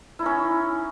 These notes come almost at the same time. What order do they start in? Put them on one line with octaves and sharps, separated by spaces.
E4 D#4 C#4